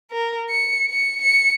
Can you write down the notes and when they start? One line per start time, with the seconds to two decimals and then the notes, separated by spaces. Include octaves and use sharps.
0.11 A#4
0.50 C#7
0.89 C#7
1.22 C#7